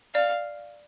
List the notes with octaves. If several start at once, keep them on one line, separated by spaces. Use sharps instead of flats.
D5 F5